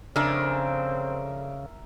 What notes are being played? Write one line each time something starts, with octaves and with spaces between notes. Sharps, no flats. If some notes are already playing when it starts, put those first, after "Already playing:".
F2 C#3 C4 D4 A#4 E5 G#5